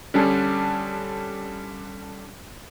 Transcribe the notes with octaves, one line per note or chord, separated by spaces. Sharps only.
D3 G3 C#4 D4 G#4 A4